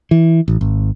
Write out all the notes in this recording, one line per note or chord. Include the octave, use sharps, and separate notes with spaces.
E3
A1
G#1